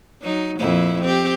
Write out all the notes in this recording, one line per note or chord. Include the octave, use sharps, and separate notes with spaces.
F#3 D#4
F2 A#2 E4
C4 G4